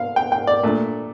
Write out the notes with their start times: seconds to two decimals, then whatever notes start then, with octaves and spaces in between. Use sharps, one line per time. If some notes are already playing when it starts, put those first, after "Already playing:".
Already playing: F5
0.16 G5
0.32 G5
0.47 D5
0.63 A#2 A3 D4